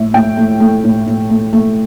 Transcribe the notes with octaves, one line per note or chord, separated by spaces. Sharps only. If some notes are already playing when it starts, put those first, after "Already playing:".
Already playing: A2 A3 E5
A2 G5
A3
A3
A2
A2
A3
A3